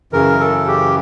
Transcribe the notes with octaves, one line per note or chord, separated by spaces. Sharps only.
F#2 C#3 E3 A#4
A4
G4